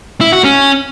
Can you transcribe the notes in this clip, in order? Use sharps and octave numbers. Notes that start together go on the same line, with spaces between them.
E4
F#4
C#4